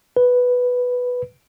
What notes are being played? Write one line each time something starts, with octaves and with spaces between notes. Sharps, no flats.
B4